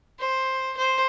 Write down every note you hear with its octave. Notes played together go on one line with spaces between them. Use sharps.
C5
C5